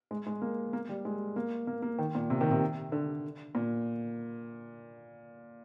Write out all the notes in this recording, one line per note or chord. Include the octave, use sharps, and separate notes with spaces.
G#3
G#3
A#3
A#3
G3
G#3
A#3
A#3
A#3
D#3
A#2
C3
D#3
C3
D3
A#2